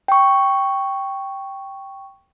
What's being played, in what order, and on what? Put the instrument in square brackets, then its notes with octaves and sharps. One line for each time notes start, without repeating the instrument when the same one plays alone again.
[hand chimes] G5 C#6